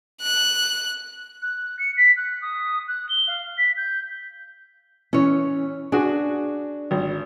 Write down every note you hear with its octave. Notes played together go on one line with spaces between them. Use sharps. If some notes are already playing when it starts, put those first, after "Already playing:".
F#6
F#6
C#7
B6
F#6
D#6
F#6
G7
F5
B6
G6
E3 C#4 C#5
D4 F#4 G#4
G#1